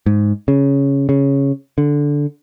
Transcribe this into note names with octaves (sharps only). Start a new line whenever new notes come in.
G#2
C#3
C#3
D3